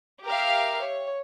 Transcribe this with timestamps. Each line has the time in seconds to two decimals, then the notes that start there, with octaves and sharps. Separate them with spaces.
0.25 G4 A#4 E5 F5
0.82 C#5